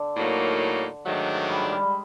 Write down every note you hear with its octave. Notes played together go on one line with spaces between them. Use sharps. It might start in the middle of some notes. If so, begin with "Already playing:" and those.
Already playing: D3
A2 F#3 A#3 D#4
G#2 D#3 F#3 A3 D4
G3
G#3
G3
G#3